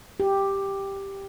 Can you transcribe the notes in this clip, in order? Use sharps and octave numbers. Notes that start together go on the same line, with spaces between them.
G4